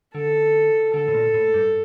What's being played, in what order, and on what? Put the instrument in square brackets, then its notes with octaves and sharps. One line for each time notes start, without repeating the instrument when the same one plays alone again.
[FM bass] D3 [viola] A4
[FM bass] D3 [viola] A4
[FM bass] A2
A#2
A2
G2